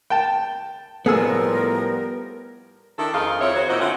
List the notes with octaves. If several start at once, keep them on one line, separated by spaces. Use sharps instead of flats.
G5 A5
A2 F3 G3 A3 B3 G#4 A#4 E6
D#3 D4 E4 A4
F2 D#3 D#4 F4 G#4 F5
F2 C4 E4 C#5 E5
D#3 F#4 G#4 C5 C#5
A#2 D#4 E4 F#4 C5 D#5
D3 C4 C#4 E4 F4 F#5